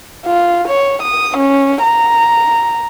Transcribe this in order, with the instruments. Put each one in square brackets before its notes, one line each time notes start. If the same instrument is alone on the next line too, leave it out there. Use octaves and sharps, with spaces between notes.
[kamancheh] F4
C#5
D#6
C#4
A#5